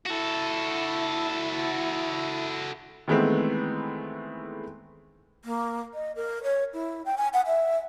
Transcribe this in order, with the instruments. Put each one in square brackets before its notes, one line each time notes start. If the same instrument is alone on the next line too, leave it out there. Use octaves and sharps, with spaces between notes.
[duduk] E4 [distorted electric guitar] F#4 A4
[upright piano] D#3 E3 G#3 A3 B3 C4
[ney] A#3
D#5
A#4
C#5
E4
G5
G#5
F#5
E5